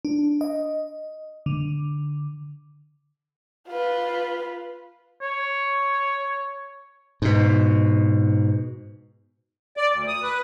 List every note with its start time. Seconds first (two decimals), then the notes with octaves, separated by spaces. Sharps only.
0.05 D4
0.41 D#5
1.46 D3
3.68 F4 B4
5.22 C#5
7.22 G#2 B2
9.77 D5
9.93 D2
10.07 D#6
10.23 B4